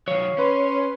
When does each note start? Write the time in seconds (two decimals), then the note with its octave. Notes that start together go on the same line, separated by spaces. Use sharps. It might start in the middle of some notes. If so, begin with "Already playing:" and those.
0.08 D#3 F#3 C#5 F5
0.38 C#4 B4 C6